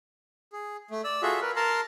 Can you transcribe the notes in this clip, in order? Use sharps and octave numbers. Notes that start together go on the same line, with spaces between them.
G#4
A3
D5 E6
F4 F#4 G#4 A4 E5
A#4 B4
A#4 A5 A#5 C6